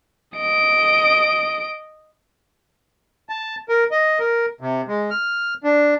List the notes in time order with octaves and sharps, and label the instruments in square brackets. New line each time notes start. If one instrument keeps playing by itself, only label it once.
[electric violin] D#5 D7
[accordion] A5
A#4
D#5
A#4
C3
G#3
F6
D4